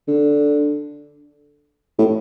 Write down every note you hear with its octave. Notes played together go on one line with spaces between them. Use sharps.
D3
A2